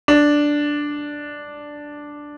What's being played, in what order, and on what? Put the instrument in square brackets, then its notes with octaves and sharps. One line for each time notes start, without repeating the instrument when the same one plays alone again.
[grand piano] D4